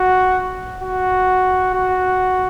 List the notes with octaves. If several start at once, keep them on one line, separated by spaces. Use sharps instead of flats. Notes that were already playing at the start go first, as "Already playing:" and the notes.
Already playing: F#4
F#4
F#4